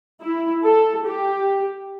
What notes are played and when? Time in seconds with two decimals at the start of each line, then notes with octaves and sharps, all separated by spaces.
0.21 E4
0.64 A4
1.05 G4